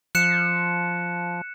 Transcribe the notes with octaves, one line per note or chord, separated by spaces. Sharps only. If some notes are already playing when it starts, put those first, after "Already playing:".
F3 F#6 C#7 E7